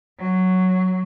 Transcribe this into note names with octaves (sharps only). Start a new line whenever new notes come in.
F#3